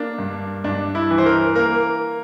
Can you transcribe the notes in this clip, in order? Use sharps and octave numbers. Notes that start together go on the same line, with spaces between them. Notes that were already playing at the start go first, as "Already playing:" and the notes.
Already playing: A#3 D4
G2
G2 D4
E4
E3
C5
A#4
A#3 A#4